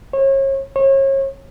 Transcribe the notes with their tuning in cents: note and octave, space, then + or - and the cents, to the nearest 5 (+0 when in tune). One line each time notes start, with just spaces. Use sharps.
C#5 -35
C#5 -35